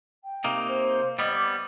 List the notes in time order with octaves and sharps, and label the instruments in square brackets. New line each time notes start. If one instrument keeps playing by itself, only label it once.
[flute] G5
[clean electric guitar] C3 A#3 D#4
[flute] C5
[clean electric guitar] G3 B3 [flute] D#5
[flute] D6